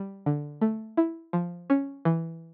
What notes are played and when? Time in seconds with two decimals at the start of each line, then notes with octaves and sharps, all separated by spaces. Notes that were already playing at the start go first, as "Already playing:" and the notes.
Already playing: G3
0.26 D3
0.61 A3
0.97 E4
1.33 F3
1.70 C#4
2.05 E3